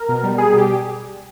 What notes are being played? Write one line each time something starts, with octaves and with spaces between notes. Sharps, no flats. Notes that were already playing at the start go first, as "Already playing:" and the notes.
Already playing: A#4
B2
G3
G3 G#4
B2
G4